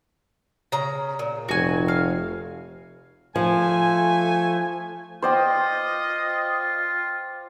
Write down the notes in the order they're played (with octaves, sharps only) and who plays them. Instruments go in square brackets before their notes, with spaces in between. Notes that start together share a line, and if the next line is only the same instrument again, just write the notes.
[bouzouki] C#3 A#5
A#2
[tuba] F1 [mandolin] F#4 G#5
[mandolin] F5
[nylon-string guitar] F3 [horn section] A3 G#5
[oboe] F4 [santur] C5 D5 G5 [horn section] D#5